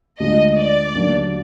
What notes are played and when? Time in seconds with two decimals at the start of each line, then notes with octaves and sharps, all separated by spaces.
0.20 D2 D3 G#3 D4 F4 D#5
0.57 D5
0.95 D#2 D3 F#3 D4